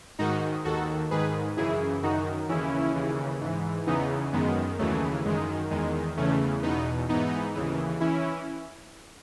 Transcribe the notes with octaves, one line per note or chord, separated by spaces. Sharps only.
G#2 D#3 D#4 F#4
D#2 D#3 F#4 A4
G#2 D#3 G#4 B4
F#2 C#3 E3 E4 G#4
F#2 D#3 D#4 F#4
D#2 C#3 E3 C#4 E4
D#2 C#3 E3
G#2 E3
E2 C#3 E3 B3 D#4
F#2 D#3 G#3 B3
D#2 C#3 E3 F#3 A3
F#2 D#3 G#3
E2 D#3 G#3
E2 C#3 E3 A3 C#4
E2 B2 B3 D#4
G#2 E3 B3 D#4
D#2 C#3 E3
E3 C#4 E4